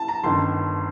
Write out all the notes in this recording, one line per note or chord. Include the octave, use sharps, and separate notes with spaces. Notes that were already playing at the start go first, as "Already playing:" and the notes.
Already playing: A5
A#5
G1 F#2 D#3 C6